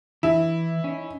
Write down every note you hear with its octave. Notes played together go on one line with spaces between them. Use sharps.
E3 E4
C#4 D#4